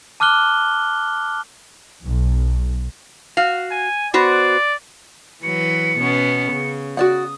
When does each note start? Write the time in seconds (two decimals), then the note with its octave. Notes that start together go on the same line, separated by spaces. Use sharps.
0.20 A5 D6 F6 F#6 G7
2.04 B1
3.37 F#4 F5
3.71 G#5
4.14 B3 F#4 C5 D5
5.43 E3 F#3 B4 C#7
5.98 B2 B3 C#4
6.52 C#3
6.97 F#4 D5 F#5 D#6